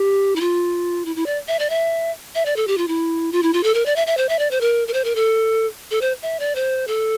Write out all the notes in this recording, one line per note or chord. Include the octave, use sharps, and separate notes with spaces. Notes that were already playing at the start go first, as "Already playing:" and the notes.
Already playing: G4
E4
F4
E4
E4
D5
E5
D5
E5
E5
D5
A4
G4
F4
E4
F4
E4
F4
A4
A#4
D5
E5
E5
C5
E5
D5
C5
A#4
A#4
C5
A#4
A4
A4
C5
E5
D5
C5
A4